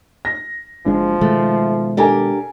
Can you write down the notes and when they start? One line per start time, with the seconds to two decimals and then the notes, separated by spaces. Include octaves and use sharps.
0.25 A#6
0.86 F#1 F3 G#3 D4
1.21 B2 D#3 G#3 A3
1.97 D4 G4 A4 A#4 G#5